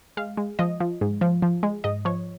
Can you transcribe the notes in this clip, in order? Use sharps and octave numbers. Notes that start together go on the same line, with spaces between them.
G#3 F5
G#3
F3 D#5
F3
G#2
F3
F3
G#3
G#2 D#5
F3 C#5